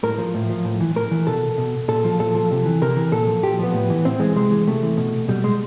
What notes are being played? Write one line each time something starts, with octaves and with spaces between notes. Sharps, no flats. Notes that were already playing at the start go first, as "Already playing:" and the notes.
A2 A#4
F3
A2
F3
A2
E3
A2 A#4
E3
B2 A4
B2
A#2 A4
F3
A#2 A4
F3
C3
E3
C3 A#4
E3
A#2 A4
F3
A#2 G4
F3 B3
A2
E3
A2 C4
E3 G#3
C3 G#3
E3
C3 A3
E3
B2
B2 G3
G#3